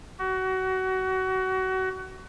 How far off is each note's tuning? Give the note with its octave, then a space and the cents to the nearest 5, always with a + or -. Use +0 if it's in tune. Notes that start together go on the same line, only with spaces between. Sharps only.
F#4 +25